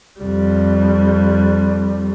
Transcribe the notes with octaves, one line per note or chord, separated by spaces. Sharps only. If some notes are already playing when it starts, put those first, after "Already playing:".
F2 G3